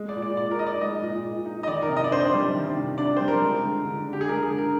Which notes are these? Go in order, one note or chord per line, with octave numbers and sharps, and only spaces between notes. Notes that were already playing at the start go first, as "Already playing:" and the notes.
Already playing: G#3
D5
A#2
D5
A#2 D5
A#4
D#4 D#5
D5
G#3 D#5
A#2
A#2
D#4
D#5
D#3 D5
A#4
C3
D#5
D5
D4 C5
D5
G3
D#3
C3
D4 D5
G3 C5
A#4
G#3
D3
D3
D4
G4
G#4
G#3 A#4
G#4
D3
A#4